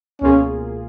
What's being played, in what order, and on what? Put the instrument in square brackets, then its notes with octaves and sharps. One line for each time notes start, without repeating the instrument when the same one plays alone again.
[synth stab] C#2 B2 A#3 F4 G#4 [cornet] C#4